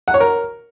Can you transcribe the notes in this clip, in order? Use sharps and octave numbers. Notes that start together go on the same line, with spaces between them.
F#5
C#5
A#4